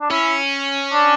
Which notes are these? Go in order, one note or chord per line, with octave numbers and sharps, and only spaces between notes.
D4
C#4 E4
D4